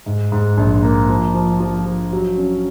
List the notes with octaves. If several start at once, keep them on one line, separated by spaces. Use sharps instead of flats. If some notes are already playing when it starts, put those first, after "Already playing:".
G#2
G#2
A#1
A#3
F3
F3
F3
F3
F#3
C#4